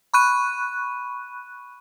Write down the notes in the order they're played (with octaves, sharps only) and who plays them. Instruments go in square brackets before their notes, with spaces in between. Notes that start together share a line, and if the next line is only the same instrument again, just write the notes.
[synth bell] B5 C#6 F#6 D#7